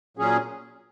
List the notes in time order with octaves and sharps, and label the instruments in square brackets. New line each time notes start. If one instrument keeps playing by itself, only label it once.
[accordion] A#2 F#3 C#4 G#4